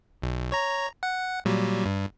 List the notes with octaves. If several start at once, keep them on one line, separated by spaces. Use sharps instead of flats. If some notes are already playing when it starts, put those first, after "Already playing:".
B1
C#5 A#5
F#5
A#2 F#3 G3
G2